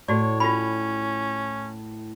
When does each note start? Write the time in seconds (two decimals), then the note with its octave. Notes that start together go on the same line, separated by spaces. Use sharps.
0.08 A2 F#4 C#5 D5
0.40 C#4 F4 B5